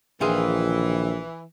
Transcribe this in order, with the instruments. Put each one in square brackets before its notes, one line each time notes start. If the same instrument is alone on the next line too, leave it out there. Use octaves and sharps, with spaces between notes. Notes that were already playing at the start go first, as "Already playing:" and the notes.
[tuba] A#1 [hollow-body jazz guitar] D#3 F4 G#4 [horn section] E3